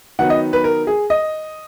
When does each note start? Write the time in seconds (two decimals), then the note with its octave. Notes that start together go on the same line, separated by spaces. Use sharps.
0.19 D#3 F#3 B3 D#4 F#5
0.30 D#5
0.53 B4
0.64 A#4
0.87 G#4
1.10 D#5